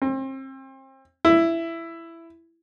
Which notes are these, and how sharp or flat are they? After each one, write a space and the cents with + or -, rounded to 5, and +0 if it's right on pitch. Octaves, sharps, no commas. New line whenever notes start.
C4 +35
E4 +10